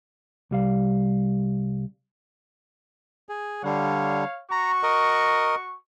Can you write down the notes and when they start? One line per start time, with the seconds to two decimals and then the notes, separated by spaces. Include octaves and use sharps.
0.51 C2 G3 F5
3.29 G#4
3.64 D3 G3 C#5 F5
4.51 F#4 A#5 C#6
4.83 A#4 D#5